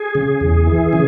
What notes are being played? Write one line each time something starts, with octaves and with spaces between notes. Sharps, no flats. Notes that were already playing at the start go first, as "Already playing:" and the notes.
Already playing: G#4
C#3
E2
E3
C#3